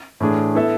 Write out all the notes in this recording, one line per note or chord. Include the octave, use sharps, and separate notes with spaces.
A2 E3 A3 D4 G#4
B3 E4 A4 E5